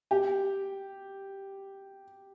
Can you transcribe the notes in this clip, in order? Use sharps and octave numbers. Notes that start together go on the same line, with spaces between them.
G4